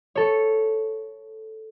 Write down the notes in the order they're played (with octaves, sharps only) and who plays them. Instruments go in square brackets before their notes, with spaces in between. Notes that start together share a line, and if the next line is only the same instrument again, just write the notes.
[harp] A4 C#5